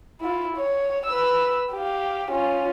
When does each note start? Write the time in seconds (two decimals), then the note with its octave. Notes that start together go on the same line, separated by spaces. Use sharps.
0.21 E4 F4
0.57 C#5
1.06 B4 E6
1.73 G4 F5
2.31 C#4 F4